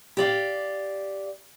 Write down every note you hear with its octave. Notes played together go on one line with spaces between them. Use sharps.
G4 D5 F5